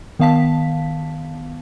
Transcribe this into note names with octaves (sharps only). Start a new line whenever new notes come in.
D#3 B3 F5 A5 B6